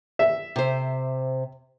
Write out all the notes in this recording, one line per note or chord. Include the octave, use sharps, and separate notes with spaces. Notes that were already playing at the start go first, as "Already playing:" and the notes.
E5
C3 C5